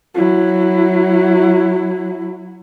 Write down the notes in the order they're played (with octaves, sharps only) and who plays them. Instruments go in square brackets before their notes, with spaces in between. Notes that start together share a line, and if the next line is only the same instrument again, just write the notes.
[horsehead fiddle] F#3 E4